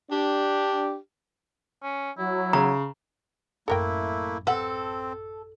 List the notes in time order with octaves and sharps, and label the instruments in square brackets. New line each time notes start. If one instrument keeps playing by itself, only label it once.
[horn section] D4 G4
[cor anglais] C#4
[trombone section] F#3 [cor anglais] E4
[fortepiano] C#3 [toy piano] A#5
[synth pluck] A1 F#2 [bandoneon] A3 A#3 E4 [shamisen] A4 A#4 G5
[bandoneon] C4 [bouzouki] A4 [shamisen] B4 F#5